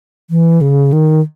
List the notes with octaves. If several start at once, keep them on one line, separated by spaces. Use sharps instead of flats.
E3
C#3
D#3